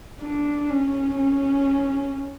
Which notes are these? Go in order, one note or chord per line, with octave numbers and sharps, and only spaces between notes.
D4
C#4
C#4